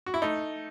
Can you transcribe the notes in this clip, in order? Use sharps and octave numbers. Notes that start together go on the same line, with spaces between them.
F#4
E4
A3 D#4